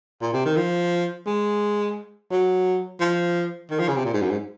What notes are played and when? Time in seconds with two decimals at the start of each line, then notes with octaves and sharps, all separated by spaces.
0.22 A#2
0.33 C3
0.45 D#3
0.57 F3
1.26 G#3
2.31 F#3
3.00 F3
3.71 D#3
3.79 F3
3.88 C#3
3.96 C3
4.05 A#2
4.13 G#2
4.22 F#2
4.31 G#2